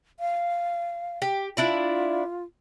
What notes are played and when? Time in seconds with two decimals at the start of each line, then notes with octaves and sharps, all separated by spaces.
0.20 F5
1.22 G4
1.57 D4 E4 F4 D5